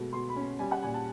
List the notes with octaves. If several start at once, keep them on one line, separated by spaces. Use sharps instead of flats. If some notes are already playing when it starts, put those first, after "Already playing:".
Already playing: B2 G#3 A3
B2 C6
B5
C#4
G3 G#5
F#5
A#2 G#5
A5